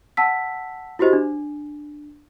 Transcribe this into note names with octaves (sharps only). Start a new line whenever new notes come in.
F#5 A5 E6 B6
E4 F#4 G4 C5 D#5
D4